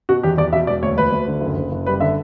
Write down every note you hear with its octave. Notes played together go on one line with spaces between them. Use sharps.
B2 F#4
E2 G4
E2 D5
B2 E5
E1 D5
D2 C#5
D2 B4
D2
D3
F#1
F#1
F#1
G3 B4
D3 E5